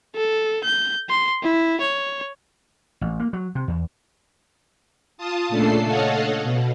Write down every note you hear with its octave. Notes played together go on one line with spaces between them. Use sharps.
A4
G6
C6
E4
C#5
A1
A#3
F#3
C3
E2
F4 A5 D#6
A#2 C#3 A3 D4 A4 C7
A4 C#5 D#5 F5 F#5
B2